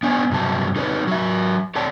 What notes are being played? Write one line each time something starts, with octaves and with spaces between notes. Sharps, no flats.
B3 D4 C#5 G#5
G2 C3 F#3 A5
D#4 A4 B4 C#5
F#3 E5
A4 C#5 D5 A5